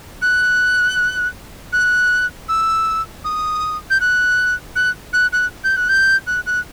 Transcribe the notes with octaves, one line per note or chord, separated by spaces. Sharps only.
F#6
F#6
E6
D#6
G6
F#6
F#6
F#6
F#6
G6
F#6
G6
F#6
F#6